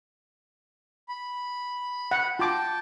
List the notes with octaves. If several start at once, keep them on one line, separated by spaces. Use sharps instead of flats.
B5
F#5
F4 G5 A5 D6